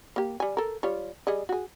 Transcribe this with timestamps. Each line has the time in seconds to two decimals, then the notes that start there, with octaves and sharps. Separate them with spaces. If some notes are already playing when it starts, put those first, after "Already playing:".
0.16 A#3 G4
0.40 G3 G#5
0.57 A4 A#4
0.83 G3 F4 C#5
1.27 G3 G#4 D#5
1.49 F#4 G#4